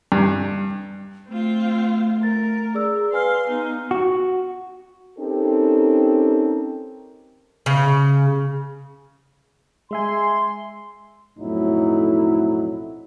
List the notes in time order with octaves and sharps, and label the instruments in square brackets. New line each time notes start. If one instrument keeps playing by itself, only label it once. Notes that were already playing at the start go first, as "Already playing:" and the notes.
[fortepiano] G2
[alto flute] A3 [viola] C4 F4
[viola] A#4 [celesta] A6
[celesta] G#4 D5 E6
[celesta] B4 G#5 F6 [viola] F5 C6
[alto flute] B3 [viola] D#4
[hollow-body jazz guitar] F#4
[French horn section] C4 C#4 D#4 G4 A4 A#4
[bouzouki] C#3
[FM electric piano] G#3 E5 G#5 [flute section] C6
[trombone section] B1 F2 A2 F#3 D#4 E4